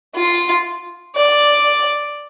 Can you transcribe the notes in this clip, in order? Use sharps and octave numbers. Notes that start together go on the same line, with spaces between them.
F4
D5